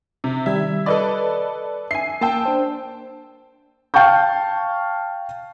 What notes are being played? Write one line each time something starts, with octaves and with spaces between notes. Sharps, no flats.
C3
D#3 G3 E5 G#6
A4 B4 D5 D#5
E5 G#5 C7
A#3 G5 A5 E6
D4 C5
F5 G5 A5 C#6 G6